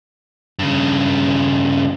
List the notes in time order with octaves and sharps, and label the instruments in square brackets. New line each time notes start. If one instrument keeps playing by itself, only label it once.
[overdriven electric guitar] G2 C#3